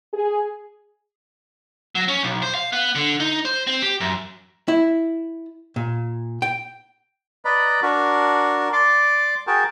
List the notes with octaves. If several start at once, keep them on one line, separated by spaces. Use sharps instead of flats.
G#4
F#3
C#4
B1
C5
F5
B3
D3
D#4
C5
C4
G4
F#2
E4
A#2
G5
B4 D5 D#5 A#5 B5
D4 F#4 A#4
D5 C6 D6
F#4 G#4 A#4 G5 A5